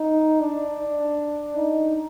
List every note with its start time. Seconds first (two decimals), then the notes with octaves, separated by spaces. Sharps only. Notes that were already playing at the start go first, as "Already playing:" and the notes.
Already playing: D#4
0.40 D4
1.56 D#4